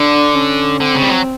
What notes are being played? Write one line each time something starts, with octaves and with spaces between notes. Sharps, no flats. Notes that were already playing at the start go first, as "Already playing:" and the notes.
Already playing: D3 D4
C#4
D3 C4
C#3
G3
F#3